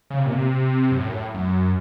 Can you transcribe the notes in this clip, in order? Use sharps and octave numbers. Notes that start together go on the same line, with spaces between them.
C#3
C3
A#2
C3
F#2
A2
F#2
A2
F#2